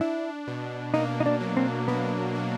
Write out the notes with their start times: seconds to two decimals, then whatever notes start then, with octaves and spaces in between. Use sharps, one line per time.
0.01 D4 E4
0.47 B2
0.94 A#3 D#4
1.20 D#4
1.26 D4
1.40 F#3
1.57 C4
1.88 B3 D4
2.35 F#3